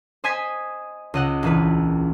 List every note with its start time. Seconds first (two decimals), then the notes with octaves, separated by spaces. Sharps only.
0.24 C5 D#5 G#5 D#6 G#6 B6
1.14 C#2 D#5 F#5
1.43 A#1 E3 B4